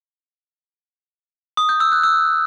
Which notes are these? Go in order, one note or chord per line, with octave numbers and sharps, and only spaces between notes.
D#6
G6
E6
F#6
E6